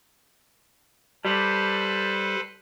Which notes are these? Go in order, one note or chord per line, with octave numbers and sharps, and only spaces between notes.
G3 A4 B4 C5